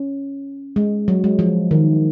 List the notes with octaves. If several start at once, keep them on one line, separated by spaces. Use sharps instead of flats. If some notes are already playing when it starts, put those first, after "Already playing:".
Already playing: C#4
G#3
F#3
G#3
F3
D#3